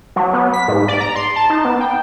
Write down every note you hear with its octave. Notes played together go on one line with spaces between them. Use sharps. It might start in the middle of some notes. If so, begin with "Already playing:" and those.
F#3
B3
B6
G#2
D5
A#5
C6
A5
D#4
B3
G5